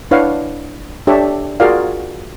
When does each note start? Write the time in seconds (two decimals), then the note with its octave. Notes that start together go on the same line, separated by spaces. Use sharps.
0.11 D4 E4 B4 C#5 F5 F#5
1.07 D4 G4 A4 C#5 D5 E5
1.60 F4 F#4 G#4 A#4 D5 F5